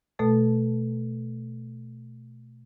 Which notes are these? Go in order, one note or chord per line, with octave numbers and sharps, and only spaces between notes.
B2 A3 A4 A5